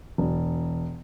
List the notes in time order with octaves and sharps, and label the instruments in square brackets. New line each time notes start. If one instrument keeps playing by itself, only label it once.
[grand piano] E1